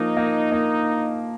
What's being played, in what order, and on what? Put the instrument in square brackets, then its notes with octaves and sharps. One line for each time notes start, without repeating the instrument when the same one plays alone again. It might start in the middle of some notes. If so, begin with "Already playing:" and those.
Already playing: [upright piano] F3 A#3 [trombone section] D#4
[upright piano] A#3
A#3